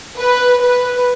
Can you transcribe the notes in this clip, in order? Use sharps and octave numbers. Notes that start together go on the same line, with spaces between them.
B4
B4